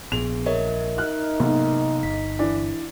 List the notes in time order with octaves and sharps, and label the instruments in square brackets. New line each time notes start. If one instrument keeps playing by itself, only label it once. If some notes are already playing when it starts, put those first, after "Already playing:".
[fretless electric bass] A#1 [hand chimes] B3 G#4 [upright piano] F7
[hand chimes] A#4 D#5 E5 [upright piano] C#5
[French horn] D#4 [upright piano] F6 F#6
[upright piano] B1 G#2 [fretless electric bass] C3 A#3 B3
[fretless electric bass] G1 [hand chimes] B6
[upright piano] E3 D4